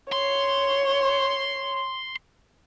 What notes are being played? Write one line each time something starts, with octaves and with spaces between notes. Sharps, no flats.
C#5 C6